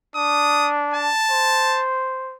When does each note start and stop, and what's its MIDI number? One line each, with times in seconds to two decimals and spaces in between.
0.16 1.10 62
0.16 0.70 87
0.94 1.84 81
1.31 2.36 72